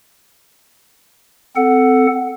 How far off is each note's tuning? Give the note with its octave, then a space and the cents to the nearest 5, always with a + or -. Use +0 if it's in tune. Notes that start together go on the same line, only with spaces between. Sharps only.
C4 -20 A4 +0 F#5 +0